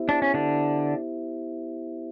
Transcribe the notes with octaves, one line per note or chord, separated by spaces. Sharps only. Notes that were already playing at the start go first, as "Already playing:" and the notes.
Already playing: B3 E4 G4 C5 E5
D4
C#4
D3 D4